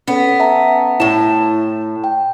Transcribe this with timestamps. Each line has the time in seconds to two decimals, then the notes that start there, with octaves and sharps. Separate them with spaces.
0.08 B3 C#4 A4
0.40 E5 A5 A#5
1.00 A2 E4 A5
2.04 G5